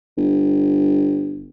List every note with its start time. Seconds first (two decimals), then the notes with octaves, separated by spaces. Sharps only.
0.17 G1